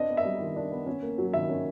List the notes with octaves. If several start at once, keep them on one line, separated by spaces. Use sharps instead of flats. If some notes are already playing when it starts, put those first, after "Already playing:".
Already playing: C4 D4 D#5
B3
E5
G3
D#3
D4
B3
C#4
A#3
F#3
D#3 E5
C#4